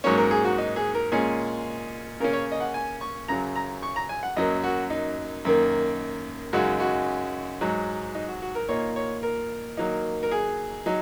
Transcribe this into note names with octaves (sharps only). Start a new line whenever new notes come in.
G#2 F#3 A#3 C#4 C#5
A#4
G#4
F#4
D#4
G#4
A#4
A#2 G#3 C#4 G#4
C#3 A#3 C#4 A#4
C#5
D#5
F#5
G#5
C#6
F#2 C#3 F#3 A#5
A#5
C#6
A#5
G#5
F#5
F#2 F#3 A#3 D#5
F#4
D#4
F#2 D#3 A#3
F#2 C#3 G#3 D#4 F#4
F#4
G#2 F#3 D#4
D#4
F#4
F#4
A#4
A#2 A#3 D#4 C#5
C#5
A#4
D#3 F#3 A#3 D#4
A#4
G#4
F#3 D#4